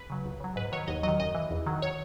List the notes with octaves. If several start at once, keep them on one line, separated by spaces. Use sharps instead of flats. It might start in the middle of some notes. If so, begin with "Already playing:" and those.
Already playing: B4
C#3 F#3
C#2
C#3 F#3
G#2 B4
D#3 F#3 C#5
D#2 D#5
D#3 F#3 D#5
F#2 D#5
E3
E2
D#3 F#3
C#5